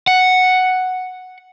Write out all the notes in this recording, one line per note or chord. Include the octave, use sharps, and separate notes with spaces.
F#5